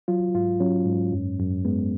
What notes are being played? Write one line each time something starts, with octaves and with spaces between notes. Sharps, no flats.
F#3 F4
G#2 F4
F#3 C#4
G#2
F#2
F#2
G#3 B3